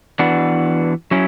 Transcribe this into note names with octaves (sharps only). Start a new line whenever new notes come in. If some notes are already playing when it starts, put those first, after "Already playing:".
E3 B3 D4 F#4 B4
F#3 C#4 E4